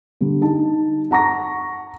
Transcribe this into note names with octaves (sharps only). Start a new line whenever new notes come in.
D3 G3
D#4 A5
F#5 A#5 C#6 A#6